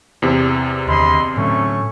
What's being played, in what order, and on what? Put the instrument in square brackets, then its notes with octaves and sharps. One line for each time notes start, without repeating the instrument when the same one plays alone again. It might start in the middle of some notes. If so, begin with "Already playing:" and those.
[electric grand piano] E2 C3
[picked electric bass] D#2 D3 [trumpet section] D#5 B5 C6
[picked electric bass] A2 D3 F#3 [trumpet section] A3 C#4 C#6